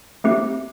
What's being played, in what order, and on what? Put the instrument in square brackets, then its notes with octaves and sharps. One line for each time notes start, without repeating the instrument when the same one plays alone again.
[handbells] A3 C4 G4